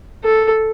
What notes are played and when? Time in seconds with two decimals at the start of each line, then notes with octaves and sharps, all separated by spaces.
0.24 A4